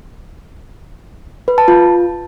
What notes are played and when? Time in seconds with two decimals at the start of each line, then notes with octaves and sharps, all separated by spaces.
1.48 B4
1.58 A5
1.68 F4